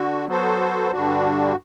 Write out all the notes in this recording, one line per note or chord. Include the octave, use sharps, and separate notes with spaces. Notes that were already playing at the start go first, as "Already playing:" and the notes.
Already playing: D3 F#4
F#3 B3 F#4 A4 C5
G2 D3 G3 D4 F#4